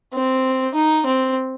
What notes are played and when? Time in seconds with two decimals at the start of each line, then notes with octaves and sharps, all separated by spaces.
0.14 C4
0.75 D#4
1.06 C4